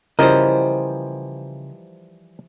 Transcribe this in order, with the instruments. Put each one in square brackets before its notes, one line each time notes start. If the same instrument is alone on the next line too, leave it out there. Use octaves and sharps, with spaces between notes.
[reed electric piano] C#3 [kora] E3 F3 G3 [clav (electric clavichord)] A#4 [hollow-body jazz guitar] C5 D#5